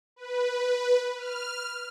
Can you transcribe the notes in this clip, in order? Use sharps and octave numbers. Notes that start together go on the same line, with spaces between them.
B4
F6